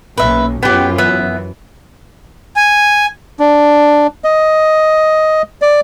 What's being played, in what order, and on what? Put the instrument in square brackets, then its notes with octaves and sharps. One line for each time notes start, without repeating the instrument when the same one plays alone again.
[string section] B1 [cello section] A#3 C#4 [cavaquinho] B4 E5
[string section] F#2 [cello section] F#3 C#4 F4 [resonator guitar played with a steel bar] B3 G4 [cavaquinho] G5
[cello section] E3 [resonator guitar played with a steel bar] B3 [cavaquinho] E5
[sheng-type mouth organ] G#5
[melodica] D4
D#5
D5